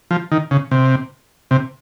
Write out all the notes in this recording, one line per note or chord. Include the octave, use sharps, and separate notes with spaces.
F3
D#3
C#3
C3
C3